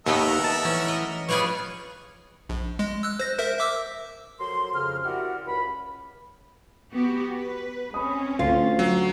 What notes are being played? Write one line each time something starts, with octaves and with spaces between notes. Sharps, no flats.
D#2 A3 B3 A#4 D#5 E5 F#5
A5
E3 C#4
D#5
G3 F4 G#4 B4 C#5
A#1
G#3
E6 F#6
C5 A#6
A#4 C5 E5
E5 D6 E6
F2 F#3 A#4 C6
F2 C#3 F6
E4 F#4 G4 A#4 D5 F#5
C#2 B5
B3 F#4 G4
B4
C4 C#4 B5 D#6
D2 F4
F#3